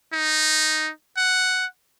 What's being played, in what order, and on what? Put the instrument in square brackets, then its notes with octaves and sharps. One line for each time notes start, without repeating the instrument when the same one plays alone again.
[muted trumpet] D#4
F#5